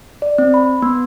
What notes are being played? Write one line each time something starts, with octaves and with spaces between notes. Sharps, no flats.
D5
C4
B5
B3